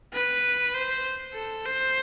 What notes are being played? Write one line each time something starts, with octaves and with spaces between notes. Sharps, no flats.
B4
C5
A4
C5